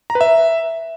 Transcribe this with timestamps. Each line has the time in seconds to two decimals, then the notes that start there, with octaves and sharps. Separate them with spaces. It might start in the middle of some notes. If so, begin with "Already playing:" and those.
0.10 A#5
0.15 B4
0.21 E5